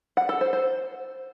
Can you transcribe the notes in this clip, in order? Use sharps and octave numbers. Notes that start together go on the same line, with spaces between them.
F#5
A4
C5
C5